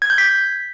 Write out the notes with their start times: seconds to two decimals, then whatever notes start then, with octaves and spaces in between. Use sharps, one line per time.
0.02 G#6
0.10 G6
0.18 B6